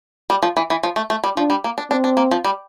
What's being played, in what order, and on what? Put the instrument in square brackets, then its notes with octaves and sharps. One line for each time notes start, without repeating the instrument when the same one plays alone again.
[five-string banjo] G3
F3
E3
E3
F3
A3
A3
G3
[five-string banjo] F3 [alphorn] D4
[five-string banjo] G3
A#3
D4
[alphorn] C4 [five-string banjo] D4
[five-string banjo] D4
A#3
F3
G3